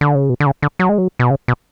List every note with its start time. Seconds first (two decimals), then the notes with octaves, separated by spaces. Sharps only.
0.01 D3
0.15 C#3
0.29 B2
0.40 D3
0.46 C#3
0.62 D3
0.79 F#3
0.89 G#3
0.98 F#3
1.19 B2
1.30 C#3
1.48 B2